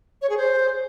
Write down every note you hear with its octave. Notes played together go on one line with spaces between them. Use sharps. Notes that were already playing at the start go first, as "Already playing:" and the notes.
C#5
G#4
C5